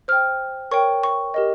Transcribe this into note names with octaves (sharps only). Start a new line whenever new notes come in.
C5 G5 F6
A#4 C#5 G5 C#6
C#6
G4 A#4 D#5